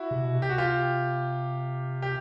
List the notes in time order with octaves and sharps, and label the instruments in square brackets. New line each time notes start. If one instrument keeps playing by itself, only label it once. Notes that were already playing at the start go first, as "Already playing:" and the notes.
Already playing: [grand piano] E4 F#4
[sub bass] C3
B2
C3
[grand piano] G4
F#4
F4 G4
G4